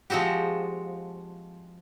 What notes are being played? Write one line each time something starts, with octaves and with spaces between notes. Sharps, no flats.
F3 G#3 C4 F#4 G4